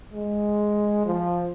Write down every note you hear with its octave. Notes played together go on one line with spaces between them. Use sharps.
G#3
F3